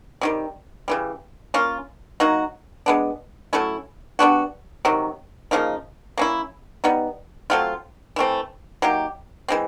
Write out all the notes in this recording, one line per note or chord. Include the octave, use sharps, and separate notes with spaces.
C3 D#3 G3
C#3 E3 G3
A#3 C#4 F4
F#3 A#3 D#4 F#4
G#3 B3 D4
F#3 A3 C#4 E4
G3 B3 D4 F#4
C3 D#3 F#3
C#3 F3 A#3 D#4
A#3 C#4 E4
G3 B3 D#4
F#3 A3 C4 F4
E3 A3 C4
F#3 A#3 D#4 G4
E3 G#3 C4